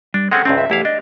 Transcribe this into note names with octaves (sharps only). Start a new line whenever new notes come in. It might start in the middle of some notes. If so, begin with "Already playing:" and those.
G3 D4
G#3 C4 C#4 A4 F#5 G5
C#2 G2 C4 C#4
E5
E2 A3 E4 G4 F5
D4 D#5